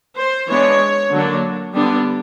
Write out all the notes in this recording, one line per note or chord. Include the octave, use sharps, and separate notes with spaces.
C5
E3 G#3 B3 D4 C#5
D3 F#3 A#3 D4
D3 G3 B3 D4